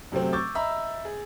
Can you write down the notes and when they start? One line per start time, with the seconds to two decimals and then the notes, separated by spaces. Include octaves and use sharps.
0.12 F#2 C3 F#3 A3 C4
0.33 C#6 D6 E6 G6 A6
0.55 D#5 E5 A#5 B5 E6
1.05 G#4